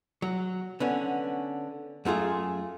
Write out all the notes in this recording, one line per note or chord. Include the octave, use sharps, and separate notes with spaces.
F#3
D3 B3 C#4
F#2 A3 F4 G#4